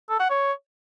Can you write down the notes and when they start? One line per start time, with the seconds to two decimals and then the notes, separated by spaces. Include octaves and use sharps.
0.10 A4
0.20 F#5
0.30 C#5